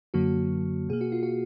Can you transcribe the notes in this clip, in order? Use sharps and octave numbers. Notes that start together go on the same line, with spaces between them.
F#2 D3 F#3 A#3 F#4
B2 A#3 G#4
F#4
F4
F#4